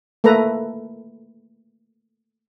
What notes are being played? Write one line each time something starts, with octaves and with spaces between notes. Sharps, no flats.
A3 A#3 A4 B4 A#5